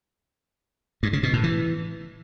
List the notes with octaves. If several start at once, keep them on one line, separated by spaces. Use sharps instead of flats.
G2
C#3
B2
A2
E3